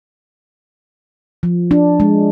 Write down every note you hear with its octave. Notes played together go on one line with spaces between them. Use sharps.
F3
D4
G#3